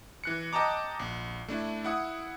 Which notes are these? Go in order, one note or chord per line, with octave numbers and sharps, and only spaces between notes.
E3 F#6 C#7
D#5 G5 A5 A#5 D6
A#1
A3 D4 E4
E4 F#5 D#6